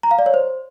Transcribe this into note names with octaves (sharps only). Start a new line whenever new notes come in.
A#5
F5
D5
C#5
C5